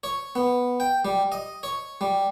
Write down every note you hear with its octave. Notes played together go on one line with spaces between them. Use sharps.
C#5
B3
G5
G3
D#5
C#5
G3